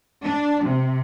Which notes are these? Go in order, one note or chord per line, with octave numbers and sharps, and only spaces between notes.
D4
C3